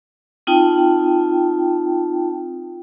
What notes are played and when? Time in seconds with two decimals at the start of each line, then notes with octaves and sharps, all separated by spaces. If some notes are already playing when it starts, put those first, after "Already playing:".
0.47 C4 D#4 F4 G5 A5